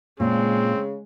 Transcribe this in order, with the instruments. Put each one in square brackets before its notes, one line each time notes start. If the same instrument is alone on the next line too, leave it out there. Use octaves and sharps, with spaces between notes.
[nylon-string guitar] A#2 [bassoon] C#3 [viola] G#3 [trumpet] C4